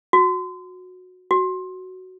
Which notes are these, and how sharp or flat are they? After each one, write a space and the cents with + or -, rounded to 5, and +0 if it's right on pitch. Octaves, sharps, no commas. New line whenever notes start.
F#4 -20
F#4 +5